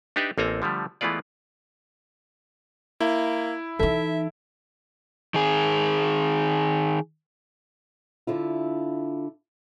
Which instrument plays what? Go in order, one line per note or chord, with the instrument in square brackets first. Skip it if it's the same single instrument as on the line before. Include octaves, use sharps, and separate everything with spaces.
[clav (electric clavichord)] D4 D#4 G4 B4 D5 E5
A1 A#3 C4 A4 G#5 A#5
D3 F3 G3 A3
E3 G#3 A3 B3 F4 D5
[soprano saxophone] A#3 [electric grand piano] E4
[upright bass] E3 D#4 [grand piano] A4 [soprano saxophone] E5
[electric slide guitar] D#3 G#4
[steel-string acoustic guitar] D3 E4 F4